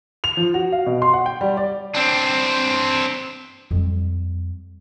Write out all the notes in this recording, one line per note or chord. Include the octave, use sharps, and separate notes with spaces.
F7
F3
F#4
F5
B2
C6
F#5
G5
G3
D5
C4 D4
F2 G3